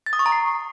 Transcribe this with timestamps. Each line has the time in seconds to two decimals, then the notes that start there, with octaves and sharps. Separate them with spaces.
0.06 A6
0.13 D#6
0.19 C#6
0.26 A#5
0.32 C7